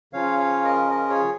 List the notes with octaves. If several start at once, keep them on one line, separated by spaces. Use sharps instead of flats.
C#3 F3 C#4 F4 C#5 F5
C#5 F5
A#4 D#5
A#4 D#5
G#4 C#5